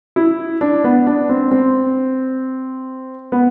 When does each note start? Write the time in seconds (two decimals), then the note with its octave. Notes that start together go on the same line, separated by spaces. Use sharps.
0.16 E4
0.61 D4
0.84 B3
1.07 D4
1.29 C4
1.51 C4
3.32 B3